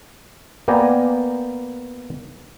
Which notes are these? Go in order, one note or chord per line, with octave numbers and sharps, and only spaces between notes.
A#3 B3 D5 G5 G#5 A#5